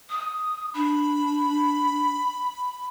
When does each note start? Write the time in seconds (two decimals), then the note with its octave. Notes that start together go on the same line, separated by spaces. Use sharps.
0.10 D#6
0.74 D4 B5